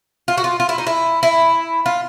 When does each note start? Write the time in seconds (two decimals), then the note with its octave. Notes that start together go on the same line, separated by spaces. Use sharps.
0.28 F4
0.37 F#4
0.44 F4
0.60 F4
0.69 E4
0.78 D#4
0.87 E4
1.23 E4
1.86 F4